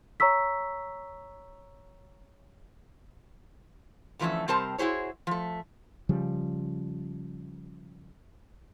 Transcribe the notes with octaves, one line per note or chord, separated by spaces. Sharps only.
C#5 A#5 C#6 E6 B6
D3 E3 F3 A3 C#4 E5
C3 G3 C4 A#4 C5 A5
E4 F#4 G#4 C5 C#5
F3 A3
C#3 F3 G3